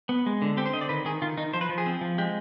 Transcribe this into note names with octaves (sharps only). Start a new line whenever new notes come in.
B3
G#3
D3
C4 G4
C5
D3 D#5
D5
D#3 B4
D#3 G#4
D#3 F4
D#3 D#4
F3 C5
B4
F3
G#4
C4
F3
G#3 G4